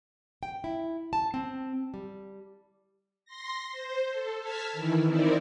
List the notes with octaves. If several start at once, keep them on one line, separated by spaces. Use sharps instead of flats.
G5
E4
A5
C4
G3
C6 A#6
C5
A4
A5 F6 G#6 B6
D#3 E3 E4
C4 D#4 E4 A#4 D5